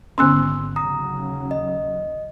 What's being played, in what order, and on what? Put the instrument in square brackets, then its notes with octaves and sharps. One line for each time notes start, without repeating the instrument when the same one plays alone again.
[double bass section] G#1 [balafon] D3 B3 C#4 [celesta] C6 E6 F#6
[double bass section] D#2 C#3 F#3 [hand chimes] A#5 [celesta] D#6
[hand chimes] D#5